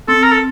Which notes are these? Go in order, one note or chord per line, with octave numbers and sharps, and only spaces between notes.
C4 A4
A#4
A4